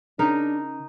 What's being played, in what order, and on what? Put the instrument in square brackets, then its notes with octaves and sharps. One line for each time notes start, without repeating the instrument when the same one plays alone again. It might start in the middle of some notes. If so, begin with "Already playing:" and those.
[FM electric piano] C#3 [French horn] D4 [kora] D#4 A#4